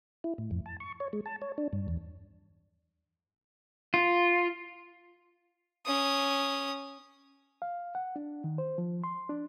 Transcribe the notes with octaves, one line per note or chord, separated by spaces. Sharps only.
E4
A2
F2
A5
C#6
C#5
G#3
A5
C#5
D4
G2
E2
F4
C#4 D#6
F5
F#5
D4
D#3
C5
F3
C6
D4